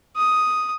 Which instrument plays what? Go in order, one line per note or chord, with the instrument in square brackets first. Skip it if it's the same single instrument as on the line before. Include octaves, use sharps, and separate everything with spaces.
[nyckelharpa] D#6